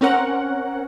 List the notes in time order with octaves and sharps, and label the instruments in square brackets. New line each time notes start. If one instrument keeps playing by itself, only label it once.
[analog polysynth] C4 C#4 A#4 F#5